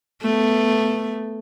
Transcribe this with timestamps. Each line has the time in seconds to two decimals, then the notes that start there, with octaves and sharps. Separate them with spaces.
0.22 A3 B3